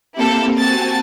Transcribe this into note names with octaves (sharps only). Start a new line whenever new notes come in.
A#3 C4 E4 G4 A4
C4 F#4 G#5 A5 A6